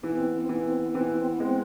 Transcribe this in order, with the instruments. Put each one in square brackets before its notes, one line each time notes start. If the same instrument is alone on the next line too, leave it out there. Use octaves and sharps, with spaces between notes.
[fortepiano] E3 [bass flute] B3
[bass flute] C4
B3
C4
[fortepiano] E3 [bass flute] B3
[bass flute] C4
B3
[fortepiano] E3 [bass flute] C4
[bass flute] B3
C4
B3
[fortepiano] G#3 [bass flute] C4